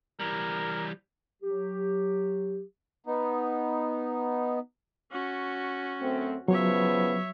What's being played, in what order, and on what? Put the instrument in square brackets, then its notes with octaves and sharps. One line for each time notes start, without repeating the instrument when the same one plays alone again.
[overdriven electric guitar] E3 G3 [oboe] A#4
[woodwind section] F#3 G4
[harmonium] B3 D#4
[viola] C#4 F#4
[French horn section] F#2 A3 C4
[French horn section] C#3 F3 B3 [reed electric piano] F#3 [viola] C#5 E5